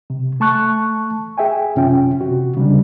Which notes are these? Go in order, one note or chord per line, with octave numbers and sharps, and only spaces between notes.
C3
A3 A5 C#6 F#6
G#4 E5 G5 G#5
F#2 C3 C#4 F4 G5
C3 F#4
C#3 G3 D4